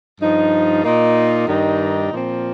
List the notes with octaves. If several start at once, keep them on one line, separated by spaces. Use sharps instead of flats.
G2 F3 D#4
A#2 A#3 D#4
G2 D#3 G3 D#4
A#2 F3 C4